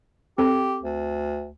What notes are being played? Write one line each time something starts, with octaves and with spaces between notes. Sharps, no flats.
C4 G4 A4
D2